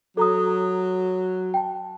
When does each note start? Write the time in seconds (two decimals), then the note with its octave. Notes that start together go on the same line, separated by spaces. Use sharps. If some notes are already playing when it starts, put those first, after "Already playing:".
0.17 F#3 A4 A#5 D#6
1.54 G5 A5